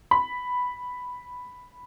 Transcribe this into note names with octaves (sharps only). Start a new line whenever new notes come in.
B5